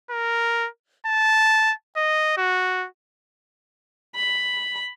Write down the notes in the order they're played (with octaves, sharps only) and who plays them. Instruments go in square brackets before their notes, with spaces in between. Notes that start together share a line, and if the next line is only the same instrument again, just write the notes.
[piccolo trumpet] A#4
A5
D#5
F#4
[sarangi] B5